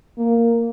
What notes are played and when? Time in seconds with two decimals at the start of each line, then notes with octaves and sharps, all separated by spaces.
0.18 A#3